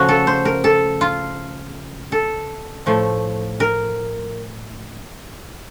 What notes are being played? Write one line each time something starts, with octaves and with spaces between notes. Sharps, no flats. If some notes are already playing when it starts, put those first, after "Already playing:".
Already playing: C#3 F3 A3 F#4
A4
C5
A#4
A4
F4
A4
A2 F3 A3
A#4